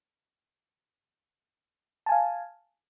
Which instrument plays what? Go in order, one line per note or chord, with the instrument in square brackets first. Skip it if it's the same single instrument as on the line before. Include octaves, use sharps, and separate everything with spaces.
[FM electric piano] A5
G#5
F5